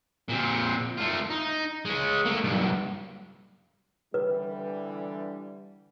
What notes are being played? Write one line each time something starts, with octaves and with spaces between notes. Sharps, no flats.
A#2 C4
A3 F4
D#4
G#3 C#4
A3 A#3
B1 G2
D3 E3 G3 B4